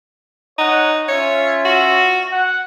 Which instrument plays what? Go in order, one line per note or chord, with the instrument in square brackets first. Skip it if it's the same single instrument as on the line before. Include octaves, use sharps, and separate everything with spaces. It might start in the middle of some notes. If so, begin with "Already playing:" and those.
[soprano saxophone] D#4 [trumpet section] C#5 F#5
[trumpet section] C#4 F4 E5 [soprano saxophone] C#5
[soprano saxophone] F#4
[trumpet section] F#5